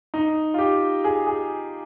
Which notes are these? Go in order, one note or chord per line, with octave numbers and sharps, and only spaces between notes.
D#4
F4
G4
G#4
G#4